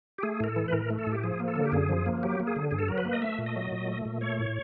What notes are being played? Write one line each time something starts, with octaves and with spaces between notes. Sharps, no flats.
G4
A3 G#4
A2 A#4
A4
E3
B4
A2 A#4
A3
A4
A2 G4
F3 G#4
A#3
A4
D3
G4
F#2 G#4
F3
A#3
F#3 G4
A#3
G#4
D3
G2 G#4
A4
F#3 A#4
B4
A#3
D#5
A3 E5
A#2
D#5
F#3
A#2
A3
A#2
A3 C#5
A2